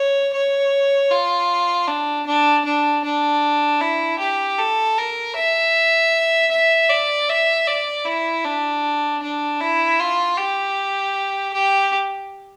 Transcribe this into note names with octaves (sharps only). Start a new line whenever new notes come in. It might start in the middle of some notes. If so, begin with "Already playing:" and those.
Already playing: C#5
C#5
F4
D4
D4
D4
D4
E4
G4
A4
A#4
E5
E5
D5
E5
D5
E4
D4
D4
E4
F4
G4
G4